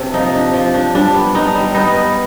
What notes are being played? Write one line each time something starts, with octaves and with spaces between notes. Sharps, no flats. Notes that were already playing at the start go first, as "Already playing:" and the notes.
Already playing: C3 A#3 D4
F3 D#4
D4
F3
D4
G3 D4
B3
D4 D#4
G3
B3 D#4
B3